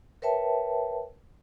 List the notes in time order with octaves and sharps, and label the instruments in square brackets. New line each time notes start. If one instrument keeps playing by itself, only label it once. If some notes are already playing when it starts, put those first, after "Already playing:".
[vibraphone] A#4 B4 C#5 E5 G5 A5